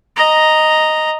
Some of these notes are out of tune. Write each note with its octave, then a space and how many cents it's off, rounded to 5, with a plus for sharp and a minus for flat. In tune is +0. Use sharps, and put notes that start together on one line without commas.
D#5 +0 A#5 +0